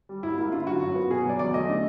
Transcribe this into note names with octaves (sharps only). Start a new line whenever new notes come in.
G3
G#2 E4
A#3 E4
D3 F4
F#3 F#4
G2
B3
B2 G#4
F#3 D5
E2 D5
A3 D#5
D3